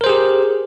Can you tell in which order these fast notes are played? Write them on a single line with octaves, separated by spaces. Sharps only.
A#4 C5 G#4 G4